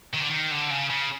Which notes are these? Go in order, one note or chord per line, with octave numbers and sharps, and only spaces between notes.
D#3
D3
D#3
D3
C#3
C#3